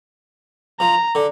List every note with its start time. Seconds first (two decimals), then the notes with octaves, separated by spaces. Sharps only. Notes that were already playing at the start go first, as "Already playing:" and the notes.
0.80 F3 A#5
1.15 D3